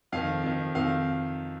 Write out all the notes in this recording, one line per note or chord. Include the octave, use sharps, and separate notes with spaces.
F2 D#3 F5
F2 D#3
F2 C3 D#3 F5